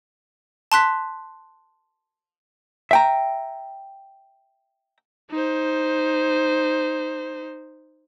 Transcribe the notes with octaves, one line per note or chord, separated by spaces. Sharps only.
A5 C6 F#6 B6
E5 G5 A#5
D#4 C5